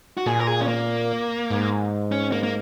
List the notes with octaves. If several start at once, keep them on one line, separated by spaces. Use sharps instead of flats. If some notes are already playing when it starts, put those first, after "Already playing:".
F#4
A#2 G#4
A#4
G#4
C#4
A#3
G#2
C#4
A#3
A#3